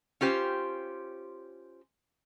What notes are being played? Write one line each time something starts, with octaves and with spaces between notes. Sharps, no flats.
C#4 F4 G4 C5